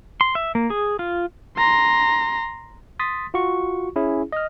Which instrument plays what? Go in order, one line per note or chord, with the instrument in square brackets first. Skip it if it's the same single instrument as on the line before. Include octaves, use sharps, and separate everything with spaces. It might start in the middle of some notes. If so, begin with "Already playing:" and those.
[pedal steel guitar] C6
E5
A#3
G#4
F4
[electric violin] A#5 C6
[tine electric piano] C6 D#6 A6 B6
F4 F#4 C#6
C#4 E4 G#4
D#5 F6